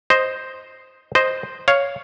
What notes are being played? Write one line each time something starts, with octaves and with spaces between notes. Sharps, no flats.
C5 D#5
C5 D#5
C#5 F5